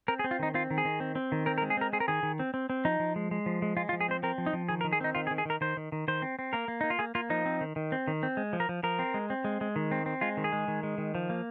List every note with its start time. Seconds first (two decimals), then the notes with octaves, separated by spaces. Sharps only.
0.08 C4 A#4
0.19 G#4
0.24 C4
0.31 F4
0.39 D#3 D#4
0.54 C4 F4
0.71 D#3
0.78 G#4
0.85 D#3
1.00 C4
1.15 C4
1.32 D#3
1.46 C4 A#4
1.58 A#4
1.62 G#3
1.70 G#4
1.77 C4 A#4
1.93 C4 G#4
2.00 A#4
2.08 D#3 G#4
2.23 D#3
2.39 C4
2.54 C4
2.70 C4
2.85 F3 D#4
3.00 F3
3.16 G#3
3.31 G#3
3.46 F3
3.62 G#3
3.77 G#3 F4
3.89 F4
3.93 F3
4.01 G#4
4.08 C4 C5
4.23 C4 A#4
4.38 F3
4.46 D#4
4.53 F3
4.69 D#3 G#4
4.81 A#4
4.84 D#3
4.93 G#4
5.00 C4 D#4
5.15 D#3 F4
5.27 G#4
5.31 D#3
5.38 G#4
5.45 D#3 A#4
5.61 D#3 C5
5.77 D#3
5.92 D#3
6.08 D#3 C5
6.22 C4
6.39 C4
6.53 A#3 A#4
6.68 A#3
6.81 A#3 D#4
6.90 F4
6.99 A#3 G#4
7.15 A#3 F4
7.30 F3 D#4
7.46 C4
7.61 D#3
7.76 D#3
7.92 C4
8.08 D#3
8.23 C4
8.37 G#3
8.53 F3
8.60 A#4
8.69 F3
8.83 F3 A#4
8.99 C4
9.14 G#3
9.30 C4
9.44 G#3
9.61 G#3
9.76 D#3
9.91 C4
10.06 C4
10.21 G#3 F4
10.37 D#3
10.44 G#4
10.53 G#3
10.68 D#3
10.83 G#3
10.98 D#3
11.15 F3
11.30 A#3